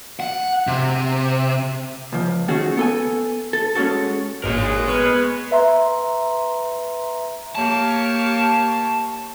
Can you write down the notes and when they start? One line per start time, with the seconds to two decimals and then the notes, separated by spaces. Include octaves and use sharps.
0.20 F#5
0.67 C3
2.13 C#2 F3
2.48 D#3 A3 C#4 F#4 G#4 A4
2.77 B3 A4 G#5
3.53 A4
3.75 G#3 C#4 D#4 F#4 A4
4.43 G#1 A#2 G#3 A#4 C#5
4.88 B3 C#6 F6 G#6
5.51 B4 E5 A#5 C6
7.55 A#3 G4 C#5 A5